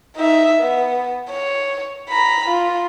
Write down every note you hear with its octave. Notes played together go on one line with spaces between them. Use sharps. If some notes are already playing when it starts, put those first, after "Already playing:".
D#4 E5
B3
C#5
A#5 B5
F4